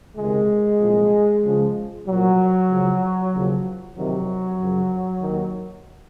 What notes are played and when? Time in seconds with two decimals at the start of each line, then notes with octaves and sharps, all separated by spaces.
0.17 C#2 C3 D#3 G#3
0.80 C2 A#2 F3
1.43 C#2 C#3 F3
2.07 C2 A#2 F3 F#3
2.70 C#2 C#3 F3
3.33 D#2 C#3 F3
3.96 F2 C3 D#3 F#3
4.59 F#2 C#3 F3
5.22 D#2 D#3